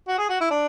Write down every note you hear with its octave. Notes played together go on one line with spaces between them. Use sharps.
F#4
G#4
F#4
E4
D4